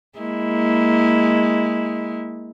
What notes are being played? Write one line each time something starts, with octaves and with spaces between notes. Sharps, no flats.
G#3 A#3 E4